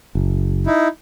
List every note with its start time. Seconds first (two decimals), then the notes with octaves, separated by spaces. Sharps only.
0.15 F#1
0.66 D#4 E4